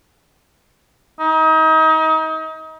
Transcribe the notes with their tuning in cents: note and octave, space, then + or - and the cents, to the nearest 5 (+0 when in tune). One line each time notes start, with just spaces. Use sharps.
D#4 +30